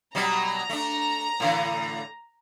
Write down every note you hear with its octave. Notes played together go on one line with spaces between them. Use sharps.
B2 F#3 G3 A#5
A3 D4
A2 D3 E3